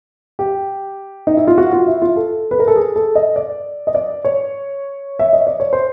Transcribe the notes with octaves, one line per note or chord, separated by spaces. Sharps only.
G4
D#4
E4
F4
F#4
F4
E4
F4
A4
B4
A#4
A4
G#4
A4
D#5
D5
D#5
D5
C#5
E5
D#5
D5
C#5
C5